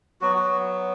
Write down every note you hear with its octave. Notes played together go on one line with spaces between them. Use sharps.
F#3 B3 F#4
F#4